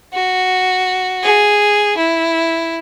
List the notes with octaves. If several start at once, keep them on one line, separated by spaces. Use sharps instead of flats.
F#4
G#4
E4